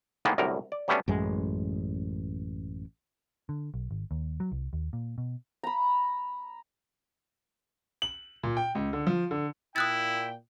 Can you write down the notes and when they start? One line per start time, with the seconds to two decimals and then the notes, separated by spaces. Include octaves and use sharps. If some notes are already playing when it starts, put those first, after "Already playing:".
0.25 A2 D#3 E3 G#3 A#3 B3
0.38 C2 F#2 A2 D3 A#4
0.72 D5
0.88 F#3 G3 A3 B3 C#4 D4
1.08 A1 F#2 G#3
3.49 D3
3.74 B1
3.91 G#1
4.11 D#2
4.40 F#3
4.52 C2
4.73 D#2
4.93 A#2
5.18 B2
5.63 A#5 B5
8.02 F#7
8.43 A#2
8.57 G5
8.75 C#2
8.93 D3
9.07 F3
9.31 D3
9.76 A#2 E4 G5 D#6 F#6 A6